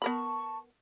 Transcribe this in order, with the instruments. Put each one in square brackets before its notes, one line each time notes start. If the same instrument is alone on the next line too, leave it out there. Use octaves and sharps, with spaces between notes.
[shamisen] B3 A#4 B5 [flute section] A5 C#6